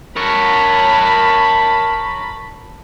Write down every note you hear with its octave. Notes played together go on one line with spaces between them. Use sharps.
A#4 C#5 A5 B5